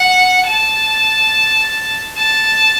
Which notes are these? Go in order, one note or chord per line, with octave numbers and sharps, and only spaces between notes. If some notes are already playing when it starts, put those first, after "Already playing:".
Already playing: F#5
A5
A5